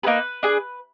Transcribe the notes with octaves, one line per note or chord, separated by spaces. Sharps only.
A#3 D#4 G#4 B4
D4 G#4